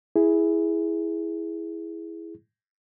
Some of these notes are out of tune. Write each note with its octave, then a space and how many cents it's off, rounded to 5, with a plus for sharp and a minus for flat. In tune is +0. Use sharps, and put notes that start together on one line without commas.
E4 +0 G#4 +0